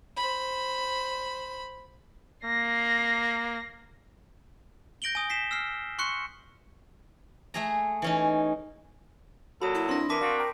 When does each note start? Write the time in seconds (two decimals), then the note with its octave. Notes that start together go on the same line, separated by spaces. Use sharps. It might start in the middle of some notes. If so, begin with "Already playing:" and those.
0.17 C5 B5
2.45 A#3 A#6 C7
5.02 G6 A#6 D7 F#7 G7
5.15 G#5 D#6
5.30 B6 C7 E7
5.51 E6 F6 C7
5.99 C6 C#6 F#6 C#7
7.54 A3 G#4 A#5
8.02 E3 C#4 D#4
9.62 A#2 F#3 F#4 A4 B5 D#6
9.75 E4
9.89 C4 D4 B5 C6 A#6
10.10 E3 A#4 A5 D6 B6
10.21 C4 D4 F#4 F5
10.38 G5 A#5 D6